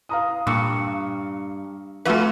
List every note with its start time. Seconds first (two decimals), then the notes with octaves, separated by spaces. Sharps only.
0.09 F5 A#5 D#6
0.47 G2 A#2 C#6 E6 C#7
2.05 F2 A3 F4 F#4 B4 E5 E6 F6